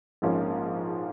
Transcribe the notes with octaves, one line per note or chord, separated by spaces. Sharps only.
A#1 G#2 F3 A#3 C#4